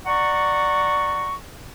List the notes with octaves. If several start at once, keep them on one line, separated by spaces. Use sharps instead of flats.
D5 F#5 A#5 C#6